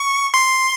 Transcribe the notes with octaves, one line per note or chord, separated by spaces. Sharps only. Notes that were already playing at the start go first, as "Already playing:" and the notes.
Already playing: C#6
C6